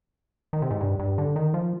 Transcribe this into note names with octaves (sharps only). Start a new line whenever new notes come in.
D#3
C3
G#2
G2
G2
D3
D#3
F3